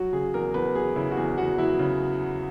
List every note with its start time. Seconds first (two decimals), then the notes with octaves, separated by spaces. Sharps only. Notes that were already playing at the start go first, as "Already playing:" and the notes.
Already playing: F#3 F#4
0.13 C#3 G#4
0.34 E2 A#4
0.54 E2 B4
0.75 F#3 G#4
0.96 C#3 E4
1.11 F#4
1.17 E2 G#4
1.38 E2 F#4
1.58 F#3 E4
1.79 C#3